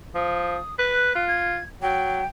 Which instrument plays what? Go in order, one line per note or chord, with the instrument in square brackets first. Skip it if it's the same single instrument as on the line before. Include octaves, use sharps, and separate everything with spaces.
[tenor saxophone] F3 [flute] D#6
[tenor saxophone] B4 [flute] F#6
[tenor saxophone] F4
[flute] G#6
[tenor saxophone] F#3 [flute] G5